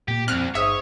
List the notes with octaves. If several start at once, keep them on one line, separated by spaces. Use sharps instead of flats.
A#2 A#3 G4
C2 F2 C4 F6 F#6
G1 G#2 C#5 E5 D#6